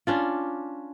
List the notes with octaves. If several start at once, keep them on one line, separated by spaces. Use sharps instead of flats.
C#4 D4 F4